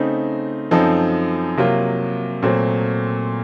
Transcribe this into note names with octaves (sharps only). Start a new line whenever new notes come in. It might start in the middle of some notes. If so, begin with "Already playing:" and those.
Already playing: C#3 A3 C4 D#4
F#2 F3 C4 D#4 A4
C3 F#3 A#3 F4
A#2 F#3 A3 C4